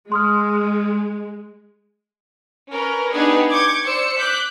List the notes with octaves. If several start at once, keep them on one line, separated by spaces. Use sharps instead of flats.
G#3 C6 D#6 F6
C#4 A#4 B4
B3 D4 D#4 G4 G#4
C#6 D6 G6 G#6
C5 D5 E6 C#7
D6 F#6 G6 B6